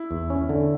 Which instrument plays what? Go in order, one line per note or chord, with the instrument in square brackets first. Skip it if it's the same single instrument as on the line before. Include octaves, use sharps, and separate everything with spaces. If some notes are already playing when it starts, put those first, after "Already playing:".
Already playing: [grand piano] E4
[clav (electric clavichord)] E2
C#4
D3